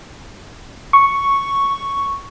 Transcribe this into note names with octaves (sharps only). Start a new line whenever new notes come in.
C#6